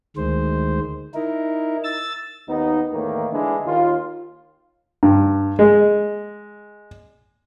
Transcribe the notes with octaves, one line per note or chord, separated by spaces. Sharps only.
D2 D#3 G#3 C5
D#4 E4 A#4
E6 A6
D#2 B3 D#4
E2 A2 D#3 A#3
D3 E3 G#3 D4 E4
D#2 F4
G2
G#3